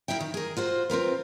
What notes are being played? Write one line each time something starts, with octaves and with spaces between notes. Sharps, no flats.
A#3 E4 G4 E5 G5
D#3
G#4 A#4
F4 F#4 C5
C4 F4 A#4 B4